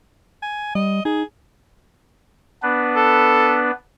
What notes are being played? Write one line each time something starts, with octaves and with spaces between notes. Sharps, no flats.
G#5
G3 D#5
D#4 G#4
B3 D4 B4
A4